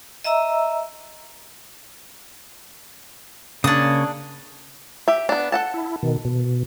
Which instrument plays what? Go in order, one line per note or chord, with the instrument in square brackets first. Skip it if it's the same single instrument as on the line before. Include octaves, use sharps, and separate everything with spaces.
[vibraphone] D#5 E5 A#5 E6
[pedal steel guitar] C#3 A#3 C#5 [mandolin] D4 D#6
[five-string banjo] G4 E5
B3 D4
A4 F#5 A5
[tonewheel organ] E4
B2 D#3
B2